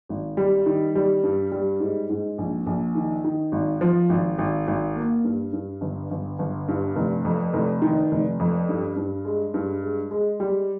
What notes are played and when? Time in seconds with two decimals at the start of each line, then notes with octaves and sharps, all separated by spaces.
0.09 G#1
0.37 G3
0.66 D#3
0.95 G3
1.23 G2
1.52 G3
1.80 G#2
2.10 G#2
2.38 A#1
2.67 A#1
2.95 D#3
3.24 D#3
3.52 G#1
3.81 F3
4.09 G#1
4.38 G#1
4.67 G#1
4.96 A#3
5.24 G2
5.53 G2
5.81 G1
6.11 G1
6.39 G1
6.68 G2
6.96 F1
7.25 F2
7.53 F1
7.82 D#3
8.11 F1
8.40 F2
8.69 G2
8.96 G2
9.25 G#3
9.54 G2
9.82 G#3
10.11 G#3
10.40 G3